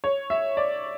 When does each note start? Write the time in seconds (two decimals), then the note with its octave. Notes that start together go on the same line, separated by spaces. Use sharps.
0.04 C#5
0.30 E5
0.57 D5